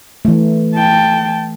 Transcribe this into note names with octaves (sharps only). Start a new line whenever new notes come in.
E3 A3
G5 A5